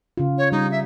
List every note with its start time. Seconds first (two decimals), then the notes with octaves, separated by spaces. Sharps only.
0.17 C#3 F4
0.38 C#5
0.52 G3 D#4
0.71 E5